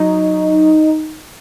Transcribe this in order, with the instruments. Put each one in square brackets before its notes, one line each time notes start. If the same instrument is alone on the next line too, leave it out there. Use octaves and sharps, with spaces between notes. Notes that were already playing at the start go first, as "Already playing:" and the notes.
Already playing: [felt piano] F#3 [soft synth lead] D#4